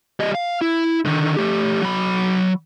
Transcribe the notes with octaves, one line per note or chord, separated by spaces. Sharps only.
G3 D#5
F5
E4
D3 D#3
A3 G4
F#3 B5